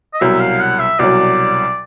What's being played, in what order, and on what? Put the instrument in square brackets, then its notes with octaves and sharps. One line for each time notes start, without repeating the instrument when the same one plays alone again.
[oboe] D#5
[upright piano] C2 B2 F#3 [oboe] E5
[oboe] F5
F#5
E5
[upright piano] C2 B2 F#3 [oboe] D5